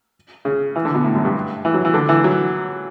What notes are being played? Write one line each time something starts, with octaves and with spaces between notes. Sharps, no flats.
C#3
E3
D3
B2
A2
F#2
G2
E3
F#3
E3
D3
E3
F#3